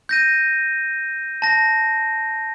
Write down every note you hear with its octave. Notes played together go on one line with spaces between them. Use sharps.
G6 A#6 D#7
A5 A#6